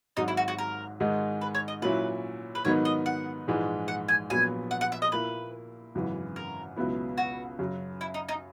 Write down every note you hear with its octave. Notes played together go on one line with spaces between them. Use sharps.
G#1 G#2 F#3 D#4
E4
F#4
F#4
A#4
G#2 D#3 G#3 D#4
B4
C#5
D#5
A#2 F#3 C#4 E4 B4
B4
G#2 D#3 F#3 B3 D#4 C#5
D#5
F#5
A#1 G#2 E3 G#3
F#5
G#5
A#1 A#2 F#3 B3 G#5
F#5
F#5
E5
D#5
A#2 A#3 E4 B4
G#1 F#2 C#3 E3
A#4
C#2 B2 F#3 B3 E4
F#4
F#2 C#3 F#3
E4
D#4
D#4